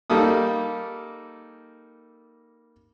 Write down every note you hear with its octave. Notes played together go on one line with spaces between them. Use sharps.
G3 A#3 D#4 A4 D#6